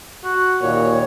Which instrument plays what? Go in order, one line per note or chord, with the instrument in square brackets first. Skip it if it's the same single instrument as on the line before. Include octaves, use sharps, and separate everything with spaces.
[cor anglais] F#4
[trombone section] D#2 A#2 [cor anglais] C#5